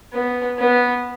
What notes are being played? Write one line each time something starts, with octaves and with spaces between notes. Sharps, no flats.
B3
B3